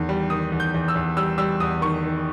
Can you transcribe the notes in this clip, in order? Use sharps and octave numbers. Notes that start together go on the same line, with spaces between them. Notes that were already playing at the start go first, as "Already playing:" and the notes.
Already playing: E2 D#3
G3
D#3 D#6
E2
G6
E2
E6
E2
G3 E6
G3 E6
E2 D#6
D#3 C#6
D#3